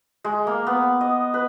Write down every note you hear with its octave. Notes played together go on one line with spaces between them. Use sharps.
G#3
A#3
B3
D#5
B4